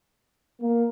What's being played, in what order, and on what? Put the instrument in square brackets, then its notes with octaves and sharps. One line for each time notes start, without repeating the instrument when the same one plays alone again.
[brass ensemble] A#3